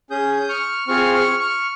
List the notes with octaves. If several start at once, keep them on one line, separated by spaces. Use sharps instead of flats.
C#4 G#4 D#6 G6
C#6 F6
C4 F4 G#4 C#6 F6
C#6 F6
C#6 F6